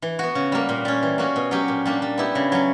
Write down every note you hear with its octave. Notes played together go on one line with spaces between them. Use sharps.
E3
B3 F#4
C#3
G3 A#3
A#2
G3 C#4
E3
A#3 C#4 F#4
B2
F#3 C#4 G4
A#2
G3 A#3 D4
G3
B3 E4 G4
C#3
F#3 C#4